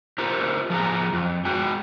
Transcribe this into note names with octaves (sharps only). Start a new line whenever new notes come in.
F4 G4 A#4 C5
F3 F4 G#4 A#5
F2
G#3 F#4 G5